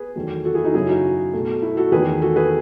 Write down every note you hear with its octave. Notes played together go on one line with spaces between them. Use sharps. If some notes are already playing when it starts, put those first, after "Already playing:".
Already playing: G#4 B4
E2 D#3 F#3 A3
F#4 A4
E4 G#4
D#4 F#4
F#2 C#3 F#3 E4 G#4
D#4 F#4
B2 A3
E4
F#4 A4
E2 D#3 A3 G#4 B4
F#4 A4
G#4 B4